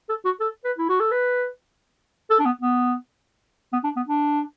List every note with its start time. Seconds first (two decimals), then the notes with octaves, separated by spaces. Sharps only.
0.09 A4
0.25 F#4
0.40 A4
0.64 B4
0.79 E4
0.89 F#4
1.00 A4
1.11 B4
2.31 A4
2.40 D4
2.46 B3
2.61 B3
3.73 B3
3.84 D4
3.96 B3
4.08 D4